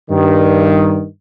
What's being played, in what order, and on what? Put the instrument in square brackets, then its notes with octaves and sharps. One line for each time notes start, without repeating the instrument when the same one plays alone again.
[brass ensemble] G2 D#3